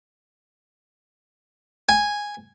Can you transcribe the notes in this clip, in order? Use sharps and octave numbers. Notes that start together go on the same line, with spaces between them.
G#5